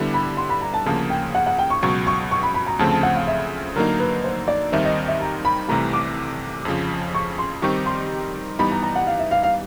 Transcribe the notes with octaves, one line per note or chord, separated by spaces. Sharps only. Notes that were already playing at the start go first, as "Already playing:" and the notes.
Already playing: D3 G3 B3 E4
B5
C6
B5
A#5
A5
D2 C#3 F3 A#3 A5
G5
F#5
F#5
G5
C#6
C#2 B2 F#3 C#6
C#6
C#6
B5
B5
A#5
D2 C#3 F3 A3 C4 A5
A5
F#5
F5
E5
D3 F#3 A#3 D#4 A#4
B4
C5
D5
D#2 D#3 G3 C4 D#4 E5
D#5
E5
A#5
B5
C2 C3 E3 A3 A#5
D6
F2 C#3 F3
C#6
C6
D#3 G3 C4 D#4 G4 C#6
C6
E3 G3 B3 D#4 B5
A#5
A#5
F#5
F5
E5
F5
F5